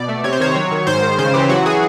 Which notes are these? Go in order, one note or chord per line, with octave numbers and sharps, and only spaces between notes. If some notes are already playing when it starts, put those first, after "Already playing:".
Already playing: B2 D5
A3
C3 C#5
C5
D#3 C#5
F#3
D#3
G#2 C5
D#3
C#3 C5
E3 G4
F#3 F#4
G#4